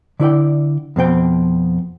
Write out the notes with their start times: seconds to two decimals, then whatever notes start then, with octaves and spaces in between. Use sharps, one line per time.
0.20 D3 E4 D5 G5
0.96 F2 B2 C4 G5